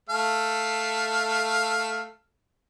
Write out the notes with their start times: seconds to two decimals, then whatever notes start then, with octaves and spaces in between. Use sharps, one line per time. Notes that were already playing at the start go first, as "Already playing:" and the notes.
0.09 A3 A4 F5